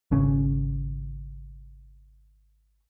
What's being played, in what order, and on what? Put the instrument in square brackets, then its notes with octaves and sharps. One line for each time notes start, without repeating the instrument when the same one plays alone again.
[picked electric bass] G#1 C#3 C#4